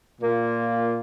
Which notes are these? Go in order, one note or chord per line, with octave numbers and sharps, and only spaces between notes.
A#2 A#3 F4